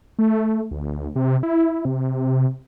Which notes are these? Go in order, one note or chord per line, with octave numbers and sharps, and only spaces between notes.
A3
D2
C3
E4
C3